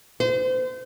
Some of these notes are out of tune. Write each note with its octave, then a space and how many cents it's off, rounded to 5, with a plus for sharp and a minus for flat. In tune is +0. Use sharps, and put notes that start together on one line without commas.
C5 -35